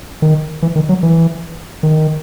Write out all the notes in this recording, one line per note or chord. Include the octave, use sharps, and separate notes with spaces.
D#3
E3
D#3
F#3
E3
D#3